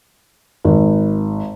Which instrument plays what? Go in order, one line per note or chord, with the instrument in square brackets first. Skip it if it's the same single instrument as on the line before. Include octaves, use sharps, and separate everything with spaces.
[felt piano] G#1